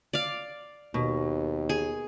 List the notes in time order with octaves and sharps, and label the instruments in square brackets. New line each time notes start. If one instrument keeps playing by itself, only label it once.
[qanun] D5 F5
[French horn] D#2 [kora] B2
[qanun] G#4